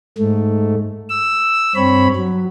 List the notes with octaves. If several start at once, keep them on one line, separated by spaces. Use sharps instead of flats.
G#2 A3
E6
G2 C4 C#5 B5
F#3